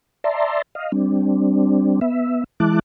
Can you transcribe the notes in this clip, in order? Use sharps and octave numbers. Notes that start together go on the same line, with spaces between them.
D5 E5 A5 A#5 C6
D#5 F5
G3 C4 D4
B3 E5
E3 G#3 E4 A5 D6 F#6